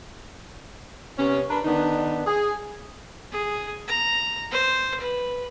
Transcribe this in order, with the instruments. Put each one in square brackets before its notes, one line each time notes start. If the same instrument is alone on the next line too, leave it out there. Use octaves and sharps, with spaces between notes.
[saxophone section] C3 B3 C#4
D4 A#4 B4
D3 D#3 B3 D4 D#4
G#4
[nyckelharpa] G#4
A#5
C5
B4